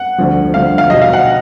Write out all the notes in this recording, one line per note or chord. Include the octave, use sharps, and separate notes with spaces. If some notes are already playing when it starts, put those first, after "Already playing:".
Already playing: F#5
D2 D3 F3
D2 D3 F3 F5
F5
B1 B2 F#3 D#5
F5
F#5